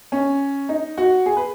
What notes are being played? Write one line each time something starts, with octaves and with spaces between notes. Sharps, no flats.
C#4
D#4
F#4
G#4
B4